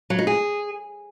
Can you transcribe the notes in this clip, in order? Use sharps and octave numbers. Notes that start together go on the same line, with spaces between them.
F#3
D#4
G#4